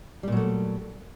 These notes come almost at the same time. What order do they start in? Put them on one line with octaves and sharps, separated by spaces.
G3 A#2 F#3 A3